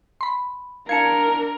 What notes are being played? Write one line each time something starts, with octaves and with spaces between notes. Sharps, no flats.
B5 C6
D4 A#4 F5 A5 G#6 C#7